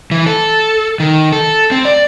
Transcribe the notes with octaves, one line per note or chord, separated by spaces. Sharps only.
E3
A4
D#3
A4
C4
D5